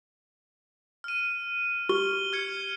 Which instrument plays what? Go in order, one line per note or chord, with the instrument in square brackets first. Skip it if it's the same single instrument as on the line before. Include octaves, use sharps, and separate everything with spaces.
[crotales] F6 D#7
[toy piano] G4 [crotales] F6 G7
[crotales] F6 G#6 C#7